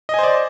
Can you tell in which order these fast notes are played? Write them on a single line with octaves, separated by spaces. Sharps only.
D#5 G#5 C5 D5